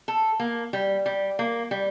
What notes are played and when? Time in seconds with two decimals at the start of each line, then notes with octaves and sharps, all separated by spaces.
0.08 A4
0.40 A#3
0.73 G3
1.06 G3
1.39 A#3
1.71 G3